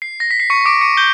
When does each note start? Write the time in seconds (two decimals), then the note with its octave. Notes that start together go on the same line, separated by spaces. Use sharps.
0.02 C7
0.20 A#6
0.31 B6
0.40 C7
0.50 C#6 C#7
0.66 D6 D7
0.81 C#6 C#7
0.97 G6 G7